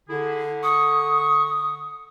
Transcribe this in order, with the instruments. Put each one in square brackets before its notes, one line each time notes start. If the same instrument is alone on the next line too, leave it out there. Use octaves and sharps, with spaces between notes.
[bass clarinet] D3 [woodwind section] E4 G#4
[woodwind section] C#6 [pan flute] D#6